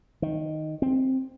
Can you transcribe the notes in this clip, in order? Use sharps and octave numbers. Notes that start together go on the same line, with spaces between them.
D#3
C4